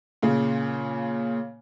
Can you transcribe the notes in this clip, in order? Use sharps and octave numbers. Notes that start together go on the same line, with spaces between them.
A#2 C#3